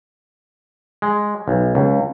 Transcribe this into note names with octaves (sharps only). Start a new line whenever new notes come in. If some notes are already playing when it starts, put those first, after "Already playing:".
G#3
B1
C#2